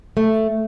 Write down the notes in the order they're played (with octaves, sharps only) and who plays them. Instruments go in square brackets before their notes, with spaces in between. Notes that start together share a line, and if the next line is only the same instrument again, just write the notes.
[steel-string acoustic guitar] A3